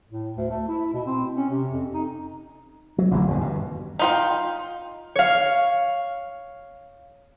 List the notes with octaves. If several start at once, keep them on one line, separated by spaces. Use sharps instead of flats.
A2
D2
A3
E4
B2
C4
C#4
C3
F2
D#4
F#3
A1 D3 F#3
F#1 D#2 C#3
G2 B2
D#4 F4 G5
C#5 F5